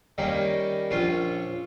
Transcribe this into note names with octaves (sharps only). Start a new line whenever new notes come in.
D#3 G3 A#3 C#4
A#1 C#4 F4